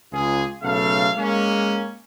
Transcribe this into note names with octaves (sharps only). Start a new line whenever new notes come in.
C#2 F4 G#4
B1 C#3 A3 A4 F5
G#3 A#3 C#4